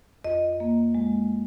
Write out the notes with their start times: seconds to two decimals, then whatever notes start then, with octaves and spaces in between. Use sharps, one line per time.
0.24 F2 D#5
0.60 A#3
0.95 G#3